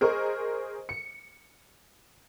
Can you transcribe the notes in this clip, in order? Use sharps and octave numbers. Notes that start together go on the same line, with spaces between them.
G#4 A#4 C5 D#5 C#6
C#7